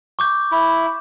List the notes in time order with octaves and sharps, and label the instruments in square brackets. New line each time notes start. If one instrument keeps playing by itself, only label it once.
[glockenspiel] C#6 D6 G6
[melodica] E4